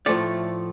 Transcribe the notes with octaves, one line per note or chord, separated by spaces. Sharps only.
A2 F3 A3 D5